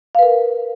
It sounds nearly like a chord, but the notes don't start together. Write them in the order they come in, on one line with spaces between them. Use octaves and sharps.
F5 B4 A#4